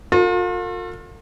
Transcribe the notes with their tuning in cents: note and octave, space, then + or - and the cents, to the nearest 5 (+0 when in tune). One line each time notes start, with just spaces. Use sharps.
F4 +40 A4 +45